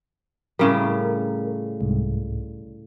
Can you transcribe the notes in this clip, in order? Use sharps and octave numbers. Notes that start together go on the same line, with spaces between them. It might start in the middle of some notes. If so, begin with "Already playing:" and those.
A2 C#3 G3 A#4
C2 G#2